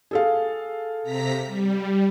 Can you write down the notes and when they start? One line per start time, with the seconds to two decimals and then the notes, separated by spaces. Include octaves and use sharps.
0.11 G#4 A4 F5
1.03 C3 A#5 B6
1.45 G3